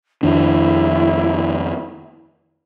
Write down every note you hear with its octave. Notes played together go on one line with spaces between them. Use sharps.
F2 D#3 D4 E4